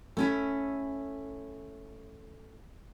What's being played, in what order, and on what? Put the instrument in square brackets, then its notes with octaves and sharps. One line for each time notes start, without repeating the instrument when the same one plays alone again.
[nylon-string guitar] A3 C#4 E4